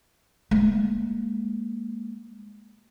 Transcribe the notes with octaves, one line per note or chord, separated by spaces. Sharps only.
G#3 A#3